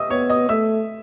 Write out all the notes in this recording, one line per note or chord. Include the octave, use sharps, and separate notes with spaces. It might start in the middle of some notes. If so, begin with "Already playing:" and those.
Already playing: D#5 E5 D#6 E6
B3 C#5 C#6
D#5 D#6
A3 E5 E6